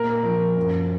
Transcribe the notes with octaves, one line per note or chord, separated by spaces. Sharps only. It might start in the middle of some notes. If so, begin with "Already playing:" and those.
Already playing: A#2 A#4
F3
F#2